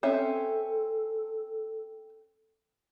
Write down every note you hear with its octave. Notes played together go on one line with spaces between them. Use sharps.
C4 C#4 A4 E5